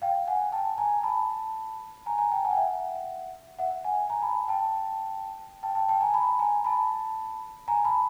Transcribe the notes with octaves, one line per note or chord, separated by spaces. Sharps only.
F5 G5
F#5 G#5
G5 A5
G#5 A#5
A5 B5
G#5 A#5
G#5 A#5
G5 A5
F#5 G#5
G5
E5 F#5
E5 F#5
F#5 G#5
G#5 A#5
A5 B5
G5 A5
G5 A5
G5 A5
G5 A5
G#5 A#5
A5 B5
G#5 A#5
A5 B5
G#5 A#5
A5 B5